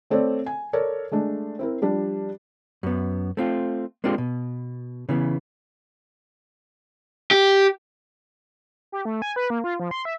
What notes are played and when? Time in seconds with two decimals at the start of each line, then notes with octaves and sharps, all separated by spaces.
0.10 A3 C4 A4 C#5 D5
0.46 G#5
0.73 A4 A#4 C#5 D5
1.11 G#3 A3 D4
1.59 C4 E4 A#4
1.82 F3 G3 D4
2.83 F#2 B3
3.37 A3 C4 F4
4.04 G#3 A#3 C4 D4 F4 G4
4.18 B2
5.09 C#3 E3 B3
7.31 G4
8.92 G4
9.05 A3
9.22 G#5
9.36 B4
9.50 A#3
9.64 F4
9.80 F3
9.91 C6
10.05 E5